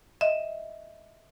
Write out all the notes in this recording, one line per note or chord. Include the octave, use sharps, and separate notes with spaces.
D#5 E5